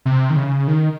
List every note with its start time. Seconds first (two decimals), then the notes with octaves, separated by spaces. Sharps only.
0.06 C3
0.30 D#3
0.36 C#3
0.68 D#3